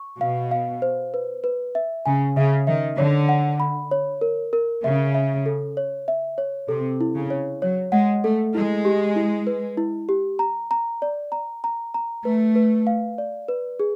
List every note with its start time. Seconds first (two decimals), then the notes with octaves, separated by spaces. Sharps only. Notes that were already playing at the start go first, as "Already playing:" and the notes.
Already playing: C#6
0.21 B2 F5
0.51 F5
0.82 C5
1.14 B4
1.44 B4
1.75 E5
2.06 C#3 G#5
2.37 C#3 E5
2.67 D#3 E5
2.98 D3 C#5
3.29 F#5
3.60 B5
3.91 C#5
4.21 A#4
4.53 A#4
4.84 C#3 E5
5.15 E5
5.46 A4
5.77 C#5
6.08 E5
6.38 C#5
6.69 C3 A4
7.01 E4
7.16 C#3
7.30 C#5
7.62 F#3 C#5
7.92 G#3 F#5
8.23 A3 A4
8.54 G#3 E4
8.85 G4
9.16 E4
9.47 B4
9.77 E4
10.09 G4
10.39 A#5
10.71 A#5
11.02 D5
11.32 A#5
11.64 A#5
11.94 A#5
12.25 A3 B4
12.55 B4
12.87 F5
13.18 D5
13.48 B4
13.80 G#4